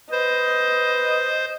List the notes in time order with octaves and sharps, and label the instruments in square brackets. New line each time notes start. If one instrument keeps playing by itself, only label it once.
[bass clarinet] B4 [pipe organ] C5 [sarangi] D#5